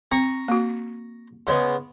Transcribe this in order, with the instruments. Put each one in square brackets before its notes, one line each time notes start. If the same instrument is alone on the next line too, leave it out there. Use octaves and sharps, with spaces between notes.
[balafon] C4 [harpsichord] A#5 C#6
[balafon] A#3 F#4
[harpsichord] C#3 G#3 B3